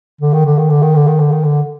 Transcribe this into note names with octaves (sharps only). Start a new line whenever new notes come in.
D3
D#3
D3
D#3
D3
D#3
D3
D#3
D3
D#3
D3